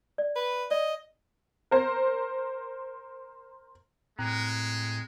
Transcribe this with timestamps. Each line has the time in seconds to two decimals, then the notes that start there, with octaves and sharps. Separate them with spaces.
0.18 D5
0.36 B4
0.71 D5 D#5
1.71 A#4 C5
4.19 A2 G#3 C4 A#5 F#6